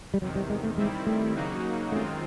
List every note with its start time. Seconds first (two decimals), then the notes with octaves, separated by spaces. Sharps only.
0.14 G3
0.21 E2 C3 D#3 F#3
0.36 G3
0.50 G#3
0.64 A3
0.78 D#3 G3 G#3 C4 E4
1.07 A3
1.35 C#3 F#3 A#3 D#4 F#4
1.91 F#2 D#3 G#3 A3 C4 F4